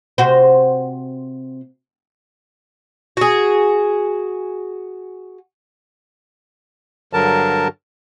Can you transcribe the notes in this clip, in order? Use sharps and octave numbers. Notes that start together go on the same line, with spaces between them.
C3 F#4 C5
F#4 G#4
G2 D3 F#3 A#4 A5